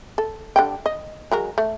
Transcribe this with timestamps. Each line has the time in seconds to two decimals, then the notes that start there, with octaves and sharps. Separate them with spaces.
0.18 A4
0.56 D3 G3 G5
0.86 D#5
1.31 F#3 G#3 A#4
1.58 A3